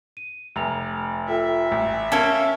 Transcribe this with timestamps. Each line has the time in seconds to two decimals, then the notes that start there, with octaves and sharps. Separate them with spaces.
0.17 D#7
0.56 F1 A#5 F7
1.28 F4 A4 E5 G5
1.72 A1 G5
2.12 A#3 C#4 A4